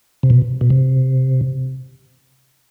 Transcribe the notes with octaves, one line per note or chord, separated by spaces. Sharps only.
C3
B2
B2
C3